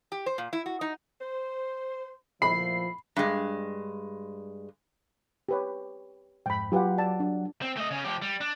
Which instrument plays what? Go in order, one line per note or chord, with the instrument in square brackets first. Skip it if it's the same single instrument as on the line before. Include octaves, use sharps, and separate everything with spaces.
[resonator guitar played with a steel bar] G4
C5
A#2
E4
F#4
D#4
[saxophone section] C5
[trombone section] A#2 F3 [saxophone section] A3 B3 E4 [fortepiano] B5 [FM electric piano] C7
[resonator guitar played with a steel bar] G2 G#3
[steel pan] G4 B4 C#5
[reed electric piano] F2 G#2 [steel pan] G5 B5
[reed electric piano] F#3 F#5 [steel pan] F4 G4 B4
[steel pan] D5 A5
D4
[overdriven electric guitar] C4
A3 D#5
C#3 C#4
F3 G4
G3
D4